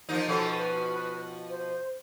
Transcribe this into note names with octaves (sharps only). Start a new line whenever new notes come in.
F3 A#3 D#4
B2 F3 C#4 A4
B4
C5